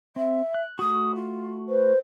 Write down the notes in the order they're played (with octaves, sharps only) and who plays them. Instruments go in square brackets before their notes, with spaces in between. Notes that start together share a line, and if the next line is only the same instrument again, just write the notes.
[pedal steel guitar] C4 [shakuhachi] E5
[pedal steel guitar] F#6
[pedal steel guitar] A3 F#4 [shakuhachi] D#6
[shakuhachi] F4
[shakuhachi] B4 [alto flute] C5